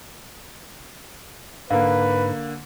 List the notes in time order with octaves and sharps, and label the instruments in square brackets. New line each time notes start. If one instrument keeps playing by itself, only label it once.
[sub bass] G#2 [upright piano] D3 A#3 [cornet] B4 [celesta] F5